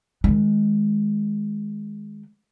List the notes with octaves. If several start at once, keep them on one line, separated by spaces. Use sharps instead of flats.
D#3 G#3